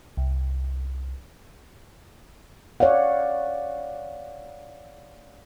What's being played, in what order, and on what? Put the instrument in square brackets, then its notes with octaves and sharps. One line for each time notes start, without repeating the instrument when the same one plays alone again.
[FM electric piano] C2
[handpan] C#5 D5 F5 F#5